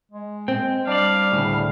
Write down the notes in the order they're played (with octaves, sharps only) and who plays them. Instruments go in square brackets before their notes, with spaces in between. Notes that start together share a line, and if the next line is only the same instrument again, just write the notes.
[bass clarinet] G#3
[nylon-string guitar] C4 [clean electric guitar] G5
[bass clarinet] G3 [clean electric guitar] D4 D5 [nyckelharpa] F5
[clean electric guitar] D2 A2 C#3